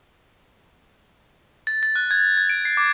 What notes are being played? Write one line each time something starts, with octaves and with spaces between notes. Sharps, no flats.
A6
A6
F#6
G#6
G#6
D7
C7
D6